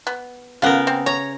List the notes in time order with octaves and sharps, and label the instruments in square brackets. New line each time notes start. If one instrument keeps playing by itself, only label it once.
[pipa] B3
[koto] C#3 B3 A#4 [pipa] F4 F#5
[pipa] C4
[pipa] C#5 [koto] A#5